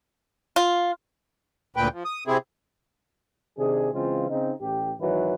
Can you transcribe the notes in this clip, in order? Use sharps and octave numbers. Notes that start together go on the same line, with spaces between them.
F4
D2 A#2 B4 G5
F3
D#6
C3 C4 E4 G#4
C3 D#3 D4 G#4
C#3 E3 G#3 C4 F4
C#3 C4 D#4
A1 G4
G#1 D#3 E3 F#3 B4